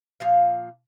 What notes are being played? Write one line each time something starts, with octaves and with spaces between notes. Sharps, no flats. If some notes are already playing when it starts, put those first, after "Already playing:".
A#2 F3 F5